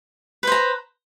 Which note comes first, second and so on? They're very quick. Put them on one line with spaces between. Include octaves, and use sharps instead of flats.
B4 C5 A#5